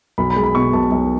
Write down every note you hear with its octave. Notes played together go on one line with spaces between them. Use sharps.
B1 B5
B5
G#3
B5
B2 C#6
B1 A5
B1